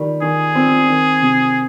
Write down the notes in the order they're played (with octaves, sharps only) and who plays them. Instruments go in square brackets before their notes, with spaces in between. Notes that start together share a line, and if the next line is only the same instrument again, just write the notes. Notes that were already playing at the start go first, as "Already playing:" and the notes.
Already playing: [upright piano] D#3 G3
[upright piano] D#3 [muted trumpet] G#4
[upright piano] C4
D#3
C3